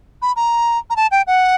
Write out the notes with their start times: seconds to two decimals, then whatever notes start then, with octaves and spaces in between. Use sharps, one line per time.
0.22 B5
0.36 A#5
0.90 A#5
0.96 A5
1.11 G5
1.27 F#5